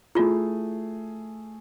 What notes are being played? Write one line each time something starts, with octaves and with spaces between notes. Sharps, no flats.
A3 E4 F4 G#4